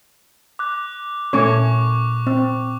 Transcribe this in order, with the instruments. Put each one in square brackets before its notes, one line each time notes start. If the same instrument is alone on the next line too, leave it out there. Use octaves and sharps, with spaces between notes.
[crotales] D6 F#6
[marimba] A#2 [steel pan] A3 C#4 C#5 [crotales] C#6 D6
[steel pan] C4